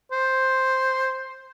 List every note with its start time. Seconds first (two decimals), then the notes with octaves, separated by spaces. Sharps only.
0.12 C5